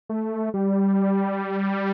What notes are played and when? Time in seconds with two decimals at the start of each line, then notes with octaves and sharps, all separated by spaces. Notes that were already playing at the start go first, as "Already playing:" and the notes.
0.09 A3
0.54 G3